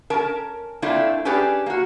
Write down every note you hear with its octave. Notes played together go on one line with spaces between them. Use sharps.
C#4 A#4 A5
A3 A#3 C4 D4 E4 F4
C#4 D4 G4 G#4 B4 D5
A#3 F#4